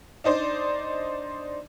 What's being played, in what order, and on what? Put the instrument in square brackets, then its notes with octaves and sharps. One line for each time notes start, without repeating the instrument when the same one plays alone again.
[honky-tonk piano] D4 D#4 C5 D5